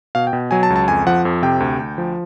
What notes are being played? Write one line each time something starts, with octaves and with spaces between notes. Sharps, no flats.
B2 F5
G5
B2
F#3 G#5
A5
C#2
A5
F2 G#5
F3 F#5
F2
C3 G5
D2
D2
F3